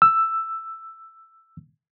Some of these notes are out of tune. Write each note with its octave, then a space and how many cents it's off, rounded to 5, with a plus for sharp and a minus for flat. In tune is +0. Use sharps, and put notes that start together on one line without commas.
E6 +5